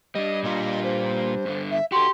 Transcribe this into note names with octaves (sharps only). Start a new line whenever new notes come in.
G3 D4 D#5
A#2 F4 D#5
C5
G2 D3
E5
F#4 G4 A4 C6